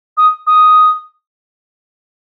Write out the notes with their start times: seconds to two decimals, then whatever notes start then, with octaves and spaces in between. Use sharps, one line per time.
0.17 D#6
0.47 D#6